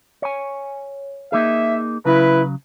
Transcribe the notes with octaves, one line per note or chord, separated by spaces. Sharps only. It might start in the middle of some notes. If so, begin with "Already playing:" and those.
C#5 G#5
A#3 D#4 G#4 E5
C#3 F#3 E4 B4